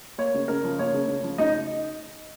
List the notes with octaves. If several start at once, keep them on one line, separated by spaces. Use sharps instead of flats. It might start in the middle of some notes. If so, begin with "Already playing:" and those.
A#3 C#5
C#3
C#3 A#4
F3
A#3 C#5
C#3
C#3
F3
C#3 D#4 D#5